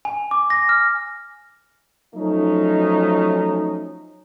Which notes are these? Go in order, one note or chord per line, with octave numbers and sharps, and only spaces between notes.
G#5
D6
A#6
F6
F3 F#3 A3 C#4 D#4